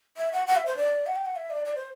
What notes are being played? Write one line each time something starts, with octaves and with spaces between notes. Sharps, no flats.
E5
F#5
F#5
E5
C5
D5
F#5
G5
F#5
E5
D5
D5
C5